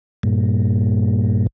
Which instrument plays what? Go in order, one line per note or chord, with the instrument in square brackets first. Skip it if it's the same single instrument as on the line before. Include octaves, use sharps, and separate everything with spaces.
[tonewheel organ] G2 A#2